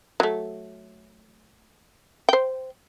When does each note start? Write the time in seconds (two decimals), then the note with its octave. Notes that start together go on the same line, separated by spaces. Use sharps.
0.20 F#3 A3
2.29 C5 G5